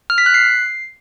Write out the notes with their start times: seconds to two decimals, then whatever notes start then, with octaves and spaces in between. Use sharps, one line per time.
0.10 F6
0.18 B6
0.26 F#6
0.34 C7